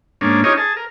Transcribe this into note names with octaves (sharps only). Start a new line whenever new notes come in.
G#2 A#3 C#4 D4
C#4 D#4 F4 G4 C#5 D#5
G#4 A5
A#4